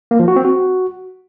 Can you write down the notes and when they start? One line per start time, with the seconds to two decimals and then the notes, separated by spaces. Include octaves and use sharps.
0.11 A#3
0.19 F3
0.28 F#4
0.36 C4
0.45 F#4